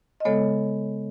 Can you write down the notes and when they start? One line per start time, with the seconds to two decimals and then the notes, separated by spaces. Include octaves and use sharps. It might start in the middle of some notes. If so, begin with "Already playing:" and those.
0.20 D#5
0.25 C#3 G#3 B3 A4 C#5